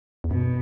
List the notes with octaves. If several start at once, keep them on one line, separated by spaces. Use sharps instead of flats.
E2
F#2 B2